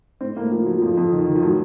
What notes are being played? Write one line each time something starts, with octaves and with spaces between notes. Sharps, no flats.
A2 C4
A2 A#3
F3 A#3
F3 F#3
F2 F3
F2
D#3
D#3
F3
A2 F#3